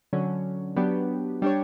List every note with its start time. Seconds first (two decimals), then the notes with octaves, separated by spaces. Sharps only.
0.13 D3 F#3 C#4
0.76 F#3 B3 D4 G4
1.42 G3 D4 G4 C#5